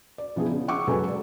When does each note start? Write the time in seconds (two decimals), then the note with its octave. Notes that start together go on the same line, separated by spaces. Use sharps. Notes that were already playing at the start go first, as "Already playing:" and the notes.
0.18 D5
0.36 E3 F3 B3 D4 G#4
0.51 C#3
0.68 F#5 C#6 D6 E6
0.87 C#2 F#3 G#3 A4 B4 G#5
1.08 D5